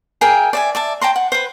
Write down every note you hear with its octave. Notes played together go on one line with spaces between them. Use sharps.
G#4 A#4 E5 G5
D5 E5 G#5
D5 E5 A5
G5 A5 A#5 C6
F#5
B4 C5